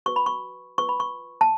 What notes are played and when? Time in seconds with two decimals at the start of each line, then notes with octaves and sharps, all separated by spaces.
0.06 F#4 B4 C#6
0.16 B5
0.26 C#6
0.78 F4 B4 C#6
0.89 B5
1.00 C#6
1.41 A5